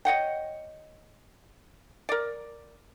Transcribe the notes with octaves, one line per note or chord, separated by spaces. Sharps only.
C#5 D#5 F#5 G5
A#4 D5